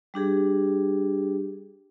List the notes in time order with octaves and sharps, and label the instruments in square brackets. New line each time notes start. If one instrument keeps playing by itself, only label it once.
[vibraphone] G3 D4 G4 G#4